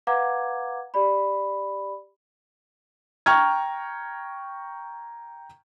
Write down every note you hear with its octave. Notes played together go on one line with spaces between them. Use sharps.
B4 F5 F#5 A#5 D6 G#6
G4 D5 B5
G5 A#5 C#6 F6 G#6